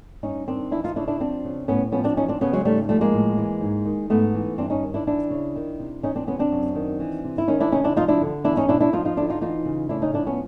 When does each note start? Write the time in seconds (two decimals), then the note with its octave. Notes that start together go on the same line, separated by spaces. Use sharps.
0.23 G2 C#4 D#4
0.47 D#3 C4 D4
0.71 E3 D4 E4
0.84 D#4 F4
0.96 C#3 D4 E4
1.08 D4 E4
1.20 F3 C4 D4
1.44 C#3
1.68 A2 B3 C#4
1.92 F3 B3 C#4
2.04 C4 D4
2.17 E3 C#4 D#4
2.28 C4 D4
2.41 C#3 B3 C#4
2.53 F#3 G#3
2.65 G#2 G3 A3
2.89 F3 G3 A3
3.01 G#3 A#3
3.13 A2
3.37 E3
3.61 G#2
3.85 D#3
4.10 G#2 A3 B3
4.34 E3
4.58 G2 C4 D4
4.70 C#4 D#4
4.83 D#3
4.94 D4 E4
5.07 E3 D4 E4
5.30 C#3
5.56 D#3
5.79 C3
6.03 E3 C#4 D#4
6.16 C4 D4
6.27 C3 B3 C#4
6.39 C4 D4
6.51 F#2
6.75 D#3
7.00 E3
7.24 C3
7.38 E4
7.48 D#3 C#4 D#4
7.60 D4 E4
7.72 C3 C#4 D#4
7.84 D4 E4
7.96 F3 D#4 F4
8.08 D4 E4
8.21 D3
8.44 E2 D4 E4
8.57 C#4 D#4
8.69 B2 D4 E4
8.81 D4 E4
8.93 F3 D#4 F4
9.05 D#4 F4
9.17 D3 D4 E4
9.30 D#4 F4
9.41 E3 D#4 F4
9.65 C#3
9.89 A2 D4 E4
10.02 C#4 D#4
10.14 F3 D4 E4
10.26 B3 C#4